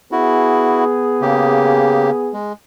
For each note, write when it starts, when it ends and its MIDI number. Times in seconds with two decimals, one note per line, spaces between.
0.12 2.37 59
0.12 0.84 64
0.12 0.84 66
0.12 2.37 68
1.22 2.10 49
1.22 2.10 58
1.22 2.10 67
2.33 2.53 56